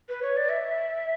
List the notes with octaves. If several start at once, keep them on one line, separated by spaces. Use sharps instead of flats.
B4
C#5
D5
E5